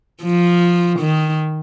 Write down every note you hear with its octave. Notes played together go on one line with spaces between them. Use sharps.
F3
D#3